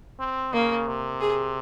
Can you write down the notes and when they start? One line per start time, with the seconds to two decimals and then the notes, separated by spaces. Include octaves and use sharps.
0.20 C4
0.53 C#3 A#3
0.87 C3
1.21 G#4